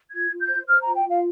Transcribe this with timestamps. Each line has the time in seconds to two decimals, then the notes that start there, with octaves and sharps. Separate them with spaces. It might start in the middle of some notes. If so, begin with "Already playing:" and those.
0.12 F4 G#6
0.31 F4
0.40 G6
0.50 C5
0.68 C5 F6
0.82 F4 A#5
0.96 G5
1.05 F4 F5